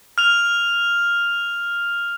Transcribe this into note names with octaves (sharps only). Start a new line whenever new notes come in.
F6 F7